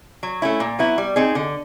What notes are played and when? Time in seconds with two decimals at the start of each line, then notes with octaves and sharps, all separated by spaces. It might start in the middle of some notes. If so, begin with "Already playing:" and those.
0.23 F#3
0.42 A3 C#4 E4
0.60 A#2
0.79 F#3 B3 E4
0.98 G3
1.16 C4 D#4 G#4
1.35 D3